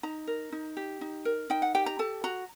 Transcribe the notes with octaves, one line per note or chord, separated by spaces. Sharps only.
D#4 A#5
A#4
D#4
G4
D#4
A#4
D#4 G5
F#5
G4 G5
A#5
A4 A5
F#4 A#5